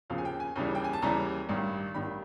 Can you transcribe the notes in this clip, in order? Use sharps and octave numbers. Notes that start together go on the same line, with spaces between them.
D#2 C#3 F3 F5
G#5
G5
G#5
D#2 C#3 E3 G3
G5
G#5
A5
D#2 C#3 E3 G3 A#5
A1 G2 D#3 G3
A1 G2 D#3 G3 B5